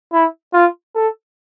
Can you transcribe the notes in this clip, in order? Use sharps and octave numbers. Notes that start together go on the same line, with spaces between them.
E4
F4
A4